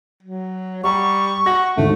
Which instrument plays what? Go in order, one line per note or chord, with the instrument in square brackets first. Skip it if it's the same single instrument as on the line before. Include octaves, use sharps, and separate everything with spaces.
[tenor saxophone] F#3
[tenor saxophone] G3 [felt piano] F#5 A#5 [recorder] C#6
[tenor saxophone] F#4 [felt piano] A#6
[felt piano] G#1 D2 G#2 [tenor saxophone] A3